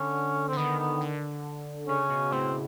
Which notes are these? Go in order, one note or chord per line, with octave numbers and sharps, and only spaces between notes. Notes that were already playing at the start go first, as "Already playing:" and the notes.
Already playing: D3 C#4
D3 C4
D#3 B3
B3
D3
C#3 C#4
B2
A2 C4